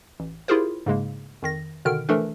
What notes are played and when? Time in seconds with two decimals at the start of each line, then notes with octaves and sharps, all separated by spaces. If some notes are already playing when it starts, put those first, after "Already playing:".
0.20 A1
0.48 E4 F4 G4 G#4 A#4 C5
0.86 G#2 C#3 G#3 A#3
1.42 F2 D#3 A#6
1.85 B2 D3 D#3 F6 D7
2.09 E3 F3 A3 D4 A4 A#4